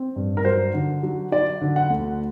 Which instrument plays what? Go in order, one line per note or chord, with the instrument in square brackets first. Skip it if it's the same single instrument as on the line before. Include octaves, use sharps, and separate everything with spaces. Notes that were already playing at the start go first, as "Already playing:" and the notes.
Already playing: [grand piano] C4
G2
A#4
F#3 C5
D3
F#3
F#3 D5
D3
F#5
D2